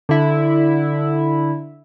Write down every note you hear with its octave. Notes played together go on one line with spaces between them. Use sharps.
D3 E4